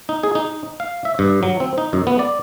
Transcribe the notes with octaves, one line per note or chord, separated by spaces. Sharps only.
D#4
G#4
D#4
F5
E5
G2
F#3
C4
D#4
F#2
B3
D5